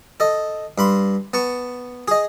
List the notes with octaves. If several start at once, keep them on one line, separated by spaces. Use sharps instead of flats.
A4 D#5
G2 B5 C6
B3 A5 C#6
G#4 D#5